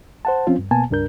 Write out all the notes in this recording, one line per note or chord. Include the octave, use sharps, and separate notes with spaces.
C5 F#5 A5
F3 C4 C#4 F4
G2
B2 A#3 B3 G#5 A5
C#2 G2 D4 A#4 G6